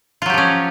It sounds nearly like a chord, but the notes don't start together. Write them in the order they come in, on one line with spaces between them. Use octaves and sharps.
F4 F#3 G4 F3 C#4